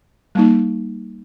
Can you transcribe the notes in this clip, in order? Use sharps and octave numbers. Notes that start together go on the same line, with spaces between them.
G3 A#3 D#4